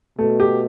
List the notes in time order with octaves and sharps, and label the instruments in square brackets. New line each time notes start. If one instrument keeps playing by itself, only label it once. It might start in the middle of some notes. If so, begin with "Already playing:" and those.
[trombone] B2 [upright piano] A3
[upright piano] G4